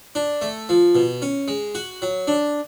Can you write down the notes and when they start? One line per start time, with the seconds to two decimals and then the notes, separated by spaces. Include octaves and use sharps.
0.15 D4
0.41 A3
0.69 F3
0.95 B2
1.22 C#4
1.48 G#3
1.75 F#4
2.02 F#3
2.27 D4